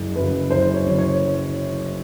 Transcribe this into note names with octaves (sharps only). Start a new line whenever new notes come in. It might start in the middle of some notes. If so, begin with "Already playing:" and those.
Already playing: F#1
F#2 C#3 B4
F#1 C5
C#5
F#2 C#3
C#5